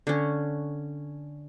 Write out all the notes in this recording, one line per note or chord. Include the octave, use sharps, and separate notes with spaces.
D3 C#4